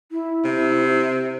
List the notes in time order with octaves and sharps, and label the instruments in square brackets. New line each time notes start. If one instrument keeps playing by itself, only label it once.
[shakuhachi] E4
[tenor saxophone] C3
[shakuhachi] C5